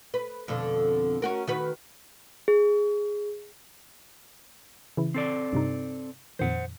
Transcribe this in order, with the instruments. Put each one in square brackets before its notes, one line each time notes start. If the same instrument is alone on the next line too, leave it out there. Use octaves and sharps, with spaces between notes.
[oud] B4
F2 B2 D3
C#4 F#4 A#4
D#3 F#4 B4
[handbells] G#4
[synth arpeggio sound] C#3 E3 E4
[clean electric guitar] C4 A4 D5
[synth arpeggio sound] G2 C3 D#4
[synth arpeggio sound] F2 A#2 D#3 [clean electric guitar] C5 F#5